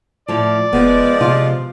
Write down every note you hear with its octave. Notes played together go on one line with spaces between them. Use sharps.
A2 F3 D5
E1 F3 G#3 B3
C3 F4